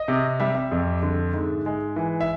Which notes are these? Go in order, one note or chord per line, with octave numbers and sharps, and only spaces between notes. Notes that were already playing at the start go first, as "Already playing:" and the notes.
Already playing: D#5
C3
G3 E5
E5
F2
D3
G#2
G#3
E3
E5